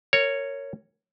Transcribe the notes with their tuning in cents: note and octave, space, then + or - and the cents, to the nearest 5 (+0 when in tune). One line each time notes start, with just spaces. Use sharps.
A#4 -20 C#5 +0